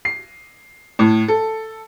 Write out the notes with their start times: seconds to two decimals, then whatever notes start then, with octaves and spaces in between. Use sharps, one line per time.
0.05 C7
0.99 A2
1.28 A4